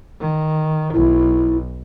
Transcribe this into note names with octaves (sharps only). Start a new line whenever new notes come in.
D#3
B1 E4